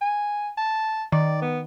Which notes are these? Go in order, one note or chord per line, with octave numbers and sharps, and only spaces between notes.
G#5
A5
D#3 D5
B3